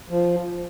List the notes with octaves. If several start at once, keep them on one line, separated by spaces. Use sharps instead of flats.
F3